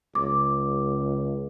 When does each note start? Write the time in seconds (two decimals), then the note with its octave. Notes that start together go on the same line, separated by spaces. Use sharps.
0.15 C#2 D6